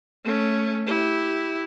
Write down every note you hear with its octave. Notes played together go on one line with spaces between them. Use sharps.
A3 C#4
E4 G4